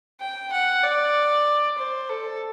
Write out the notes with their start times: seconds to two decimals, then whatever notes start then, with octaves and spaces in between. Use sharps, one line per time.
0.20 G5
0.52 F#5
0.84 D5
1.78 C5
2.09 A4